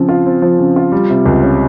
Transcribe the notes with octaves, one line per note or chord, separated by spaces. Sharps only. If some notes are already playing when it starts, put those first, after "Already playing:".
Already playing: C#3 F3 C4
F4
C4
F3
C#3
F4
G3
C3
C#2
C#4